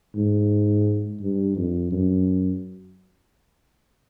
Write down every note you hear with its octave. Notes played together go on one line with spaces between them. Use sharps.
G#2
G2
F2
F#2